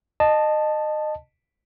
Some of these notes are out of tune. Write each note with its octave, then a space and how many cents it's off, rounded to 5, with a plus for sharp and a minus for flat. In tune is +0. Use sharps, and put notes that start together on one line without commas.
D#5 -25 A5 +0